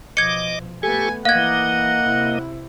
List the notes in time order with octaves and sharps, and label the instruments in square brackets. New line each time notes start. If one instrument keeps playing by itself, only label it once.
[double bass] B2 F3 [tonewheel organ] D#5 D6 [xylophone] G#6 C#7
[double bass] A3 B3 [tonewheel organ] G4 A4 C#6 [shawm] G#5
[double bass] D#3 E3 [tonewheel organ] A#3 D#5 [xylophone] F5 G#6 [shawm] F#5
[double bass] C3 E4